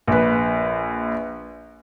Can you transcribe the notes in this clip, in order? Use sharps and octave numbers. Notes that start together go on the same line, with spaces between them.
A#1 B4